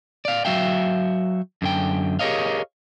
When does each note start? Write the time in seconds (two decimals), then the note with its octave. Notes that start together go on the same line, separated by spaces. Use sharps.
0.25 D5 F5
0.45 F#3 F#4 E5 F5 G5
1.62 F#2 D3 G5
2.19 G4 G#4 A#4 C#5 D#5 F5